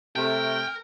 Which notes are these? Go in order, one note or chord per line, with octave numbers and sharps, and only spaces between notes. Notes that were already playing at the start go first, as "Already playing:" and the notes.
C3 A3 A#4 G5